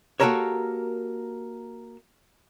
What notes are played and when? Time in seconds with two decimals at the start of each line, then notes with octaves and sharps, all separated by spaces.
0.20 A#3 F#4 G4 A4 A#4 C#5